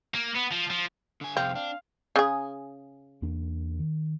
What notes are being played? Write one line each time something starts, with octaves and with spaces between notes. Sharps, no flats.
A#3
B3
F3
F3
D3 G#5
F2 C3 C4 G#4 F5
D4 F5
C#3 G#4
E2 A#3 D4
D#3